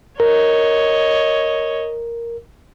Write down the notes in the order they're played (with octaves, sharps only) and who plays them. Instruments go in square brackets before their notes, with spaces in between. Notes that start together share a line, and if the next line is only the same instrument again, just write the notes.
[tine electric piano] A#4 [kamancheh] C#5 D#5